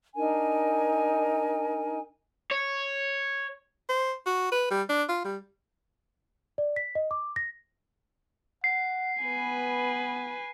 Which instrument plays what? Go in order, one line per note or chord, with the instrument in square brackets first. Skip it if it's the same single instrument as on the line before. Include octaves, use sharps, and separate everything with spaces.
[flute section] D4 D#4 A#4 G#5
[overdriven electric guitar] C#5
[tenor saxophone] C5
F#4
B4
G3
D4
F4
G3
[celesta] D5
B6
D#5
D6
A#6
[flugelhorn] F#5 [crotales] C7
[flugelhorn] B3 [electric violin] B4 G#5